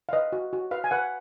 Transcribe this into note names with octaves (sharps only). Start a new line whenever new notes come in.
F5
B4 D#5
F#4
F#4
B4 F5
G#5
B4 F#5